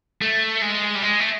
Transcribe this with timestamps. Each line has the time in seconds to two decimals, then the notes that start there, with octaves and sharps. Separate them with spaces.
0.22 A3
0.62 G#3
0.95 G3
1.02 G#3
1.20 A3